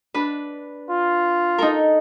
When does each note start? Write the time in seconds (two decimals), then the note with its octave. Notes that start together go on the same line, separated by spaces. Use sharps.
0.14 D4 B4
0.90 F4
1.58 D#4 A4 A#4